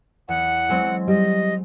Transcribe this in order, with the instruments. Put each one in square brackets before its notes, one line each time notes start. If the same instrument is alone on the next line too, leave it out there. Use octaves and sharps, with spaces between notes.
[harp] E2 [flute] F#5
[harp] F#3 G#3 C4
[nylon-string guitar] G3 [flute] D#5